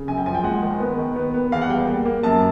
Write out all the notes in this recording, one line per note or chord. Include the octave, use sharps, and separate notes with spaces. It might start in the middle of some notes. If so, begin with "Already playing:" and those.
Already playing: C#3
F#2 G#5
G5
F3 G#5
G5
G#3 F#5
D#3
B3
D#3
B3
B3
E2 F5
F#5
G3 G5
A#3
A#3
F#2 A5